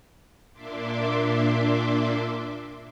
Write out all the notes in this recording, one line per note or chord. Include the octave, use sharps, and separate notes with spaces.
A#2 A#3 D4 E5 C6 D6